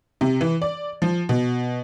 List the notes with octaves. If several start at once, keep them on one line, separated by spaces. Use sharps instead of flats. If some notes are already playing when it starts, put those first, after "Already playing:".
C3
E3
D5
F3
B2